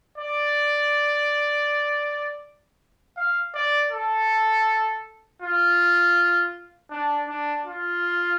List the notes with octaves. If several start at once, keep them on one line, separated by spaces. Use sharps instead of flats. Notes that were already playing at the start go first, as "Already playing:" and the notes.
D5
F5
D5
A4
F4
D4
D4
F4